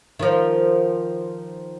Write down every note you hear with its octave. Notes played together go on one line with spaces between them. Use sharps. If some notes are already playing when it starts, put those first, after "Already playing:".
D#3 F3